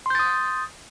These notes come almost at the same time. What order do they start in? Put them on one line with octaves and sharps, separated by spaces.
C6 G6 A6 D#6